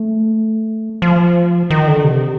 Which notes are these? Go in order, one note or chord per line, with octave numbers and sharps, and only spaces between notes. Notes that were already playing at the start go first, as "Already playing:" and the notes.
Already playing: A3
F3
D#3
D3
C3